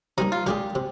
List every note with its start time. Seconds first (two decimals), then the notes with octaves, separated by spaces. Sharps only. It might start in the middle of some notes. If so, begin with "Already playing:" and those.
0.18 C3 G3 A#3 D#4
0.32 F4
0.46 A#2 G#3 D4 F4 G4 G#4
0.75 C3